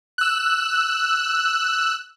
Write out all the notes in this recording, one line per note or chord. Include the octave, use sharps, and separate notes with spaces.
E6 F#6